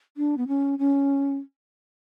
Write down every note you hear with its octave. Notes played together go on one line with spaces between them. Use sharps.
D4
B3
C#4
C#4